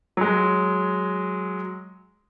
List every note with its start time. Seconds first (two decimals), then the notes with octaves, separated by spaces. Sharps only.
0.17 F#3 G#3